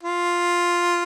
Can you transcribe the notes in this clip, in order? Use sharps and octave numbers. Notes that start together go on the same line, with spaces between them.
F4